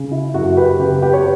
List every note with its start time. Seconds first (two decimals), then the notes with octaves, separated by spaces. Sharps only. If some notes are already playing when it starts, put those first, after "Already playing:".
Already playing: C#3
0.11 E4
0.34 F#2 F#4
0.57 G4 B4
0.79 C#3 G4 B4
1.02 G4 B4
1.13 C#5